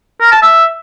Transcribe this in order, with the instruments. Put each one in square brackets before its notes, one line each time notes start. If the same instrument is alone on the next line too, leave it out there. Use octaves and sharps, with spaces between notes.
[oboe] A#4
A5
E5